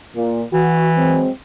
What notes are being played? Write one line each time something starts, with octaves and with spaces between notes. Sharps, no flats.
A#2
E3 F#4
F#3 G#3 C4